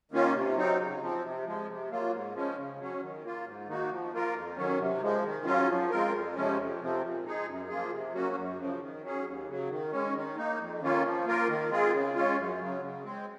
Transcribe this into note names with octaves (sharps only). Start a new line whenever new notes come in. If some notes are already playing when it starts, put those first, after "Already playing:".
D#3 A#3 C#4 F4
C3
F#3 C4 D#4
C#3
F3 C4
C3
F3 G#3
C3
F#3 A#3 F4
G#2
F3 G#3 C#4
C#3
F#3 C#4
D#3
A#3 F4
G#2
D#3 A#3 D#4 F#4
F3
A#3 F4 A#4
F2
D#3 F#3 C#4
C3
F3 G#3
D#3
F#3 C#4 F4
F3
G#3 C4 F4 A#4
F2
C3 F3 G#3 C#4
F2
C3 F3 C4
A#2
G#3 D#4 G#4
F#2
F3 A#3 F4 G#4
C3
F#3 A#3 C#4 F#4
F#2
C#3 F3
D#3
F#3 C#4 G#4
D#2
C#3 F#3
D#3
G#3 C#4
D#3
A#3 D#4
F2
D#3 A#3 C#4 F4
F3
A#3 F4 A#4
D#3
G#3 C4 F4 G#4
C#3
G#3 C#4 F4
F#2
C#3 F#3
C#3
G#3 C4